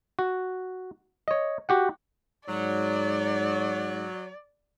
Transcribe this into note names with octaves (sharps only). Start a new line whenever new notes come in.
F#4
C#5 D#5
F#4 G4 F#5
G#2 F#3 D5